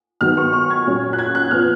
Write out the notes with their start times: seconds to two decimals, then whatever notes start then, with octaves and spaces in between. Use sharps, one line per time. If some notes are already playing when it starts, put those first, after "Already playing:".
0.21 D#3 F#3 B3 F6
0.37 C#6
0.53 C#6
0.70 G#6
0.86 A#2 F#3 C#4
1.13 F#6
1.19 G#6
1.35 F#6
1.51 F3 B3 F6